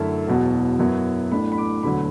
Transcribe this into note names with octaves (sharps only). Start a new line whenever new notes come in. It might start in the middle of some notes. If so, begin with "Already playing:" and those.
Already playing: F#2 D3 A3 E4 A5
E1 E2 B2 F#3
F#2 F#3 B3 E4
A1 A2 A3 D4 B5
B5
D6
E1 D2 D3 F#3 B5